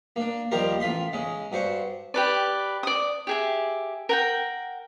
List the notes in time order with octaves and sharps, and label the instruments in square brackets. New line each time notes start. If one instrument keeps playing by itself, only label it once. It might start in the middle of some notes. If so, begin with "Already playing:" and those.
[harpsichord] A#3 D4
D#2 F3 G3 G4 A#4 C6
A1 F4 B5 C6
C#3 G#3 C#4
G2 F#4 C5 C#6
[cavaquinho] G4 B4 D5
D5 D#6
G4 G#4 E5
A#4 F#5 G5